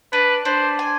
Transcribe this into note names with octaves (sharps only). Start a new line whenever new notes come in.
D4 B4
D4 C5
G#5